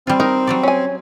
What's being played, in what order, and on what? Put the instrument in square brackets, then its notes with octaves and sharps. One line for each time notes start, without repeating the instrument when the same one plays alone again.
[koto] G3 F4 [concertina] C4
[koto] D#4 [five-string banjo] A#4
[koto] F#3 G3 D5
[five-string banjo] C#4 G#5